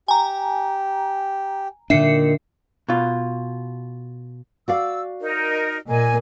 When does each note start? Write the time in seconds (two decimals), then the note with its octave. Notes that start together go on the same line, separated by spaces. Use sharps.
0.08 G4 G#5 A#5
1.90 A#2 D3 D#3 D4 E5 C7 C#7
2.88 B2 F4
4.68 F#4 D5 F5 E6
5.21 D#4 A#4
5.88 A#2 A#3 D#5 G#5